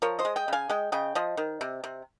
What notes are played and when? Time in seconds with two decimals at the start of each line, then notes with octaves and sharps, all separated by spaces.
0.02 F3 A#4 C#5
0.19 C5 D#5
0.25 G#3
0.36 D#5 G5
0.48 C#3 F5 G#5
0.69 G#3 D#5 G5
0.92 C#3 D#5 G5
1.15 F3 C5 D#5
1.37 D#3
1.61 C3
1.84 C3